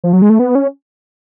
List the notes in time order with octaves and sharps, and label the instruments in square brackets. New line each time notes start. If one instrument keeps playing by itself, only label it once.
[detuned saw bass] F3
F#3
G#3
A3
B3
C#4